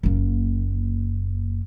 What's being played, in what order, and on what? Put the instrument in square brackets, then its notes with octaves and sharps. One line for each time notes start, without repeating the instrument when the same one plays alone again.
[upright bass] F#1 A#3